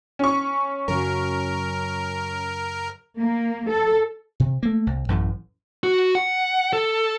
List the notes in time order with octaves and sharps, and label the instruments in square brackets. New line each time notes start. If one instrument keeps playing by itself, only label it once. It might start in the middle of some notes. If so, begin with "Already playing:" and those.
[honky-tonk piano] C#4 C#6
[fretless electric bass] F#2 C#3 F#3 [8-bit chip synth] A#4
[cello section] A#3
A4
[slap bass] C3
A3 A#3
C2
A1 F#2 A2
[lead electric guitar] F#4
F#5
A4